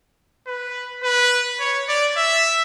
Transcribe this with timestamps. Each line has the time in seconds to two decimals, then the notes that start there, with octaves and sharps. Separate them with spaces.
0.47 B4
1.04 B4
1.60 C#5
1.88 D5
2.17 E5